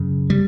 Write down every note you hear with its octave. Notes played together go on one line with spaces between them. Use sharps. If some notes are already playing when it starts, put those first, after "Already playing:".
Already playing: F#2 C#3
G3